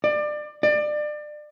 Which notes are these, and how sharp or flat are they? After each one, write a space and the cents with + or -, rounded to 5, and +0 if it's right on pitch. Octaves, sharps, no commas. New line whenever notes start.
D5 +25
D5 +30